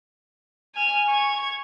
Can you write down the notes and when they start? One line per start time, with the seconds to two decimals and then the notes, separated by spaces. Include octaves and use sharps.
0.75 G#5 F6
1.09 C#6 G#6